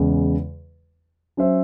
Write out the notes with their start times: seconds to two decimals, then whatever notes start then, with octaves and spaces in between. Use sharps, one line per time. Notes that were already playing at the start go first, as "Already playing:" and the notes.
Already playing: E2 C#3 G#3
1.37 F#3 C#4 F#4 C5 E5